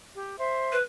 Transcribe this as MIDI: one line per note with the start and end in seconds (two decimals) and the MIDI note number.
0.14 0.37 67
0.37 0.76 72
0.37 0.76 76
0.72 0.81 71